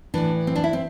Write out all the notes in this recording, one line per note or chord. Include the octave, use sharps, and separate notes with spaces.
A2 E3 D4
C4
D4
E4
C4